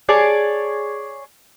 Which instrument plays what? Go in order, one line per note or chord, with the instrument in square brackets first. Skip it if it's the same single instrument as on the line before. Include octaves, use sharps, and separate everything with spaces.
[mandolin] G#4 C#5 D5 A5